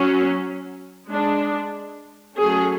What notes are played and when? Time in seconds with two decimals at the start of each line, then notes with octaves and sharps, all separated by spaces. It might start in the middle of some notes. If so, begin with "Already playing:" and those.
Already playing: F#3 C#4
1.08 G#3 D4
2.37 F#3 A3 C#4 G#4